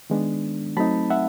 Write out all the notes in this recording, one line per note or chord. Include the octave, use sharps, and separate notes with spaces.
D#3 G#3 B3 D4
F#3 A3 C4 D#4 A5 B5
E5 F#5